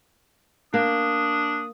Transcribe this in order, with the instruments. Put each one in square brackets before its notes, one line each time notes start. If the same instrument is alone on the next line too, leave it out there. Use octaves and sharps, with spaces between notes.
[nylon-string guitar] A#3 [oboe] D4 [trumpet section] D#6